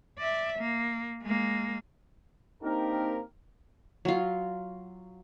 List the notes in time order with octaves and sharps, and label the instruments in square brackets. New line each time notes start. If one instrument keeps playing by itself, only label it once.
[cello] D5 E5
A#3
G#3 A#3
[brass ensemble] A#3 C4 D4 D#4 G4 A#4
[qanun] F#3 F4